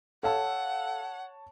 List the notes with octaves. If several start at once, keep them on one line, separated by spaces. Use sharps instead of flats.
A4 C#5 F5 F#5 A5 E6